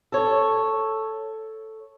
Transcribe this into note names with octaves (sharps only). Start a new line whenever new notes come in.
A4 C#5